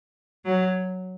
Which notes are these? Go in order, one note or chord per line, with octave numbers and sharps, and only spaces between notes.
F#3